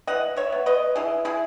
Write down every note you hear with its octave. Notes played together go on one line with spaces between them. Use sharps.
E3 D#5 F#5
C#5 E5
B3
B4 D#5
E3 E4 G#4
E4 G#4